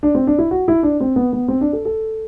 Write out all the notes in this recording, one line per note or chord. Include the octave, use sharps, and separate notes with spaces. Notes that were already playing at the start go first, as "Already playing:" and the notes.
D4
C4
D4
E4
F#4
E4
D4
C4
B3
B3
C4
D4
A4
A4